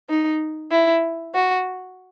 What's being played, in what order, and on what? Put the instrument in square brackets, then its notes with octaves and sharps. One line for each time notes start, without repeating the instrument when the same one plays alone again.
[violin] D#4
E4
F#4